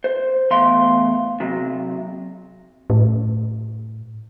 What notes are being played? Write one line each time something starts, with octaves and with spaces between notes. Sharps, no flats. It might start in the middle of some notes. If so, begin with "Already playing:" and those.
C5
E2 A2 F5 C6
C3 F#3
A2